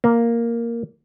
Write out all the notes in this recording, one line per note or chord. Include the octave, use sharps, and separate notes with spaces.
A#3